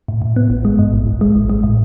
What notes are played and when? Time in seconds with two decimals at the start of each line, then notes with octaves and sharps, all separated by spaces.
0.08 A2
0.22 A2
0.36 B3
0.50 A1
0.65 G#3
0.79 G#2
0.93 A1
1.07 A1
1.21 G#3
1.35 A1
1.49 G#3
1.64 A2